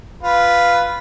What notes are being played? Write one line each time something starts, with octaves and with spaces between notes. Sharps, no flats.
F4 B4